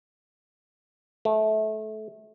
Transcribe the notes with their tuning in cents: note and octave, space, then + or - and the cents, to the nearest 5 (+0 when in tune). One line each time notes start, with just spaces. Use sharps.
A3 -25